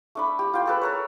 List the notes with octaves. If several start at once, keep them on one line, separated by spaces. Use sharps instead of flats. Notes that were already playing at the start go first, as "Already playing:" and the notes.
A3 D4 B5
G4
F4 G5
G#4 A4 B4
A4 A#4 C#5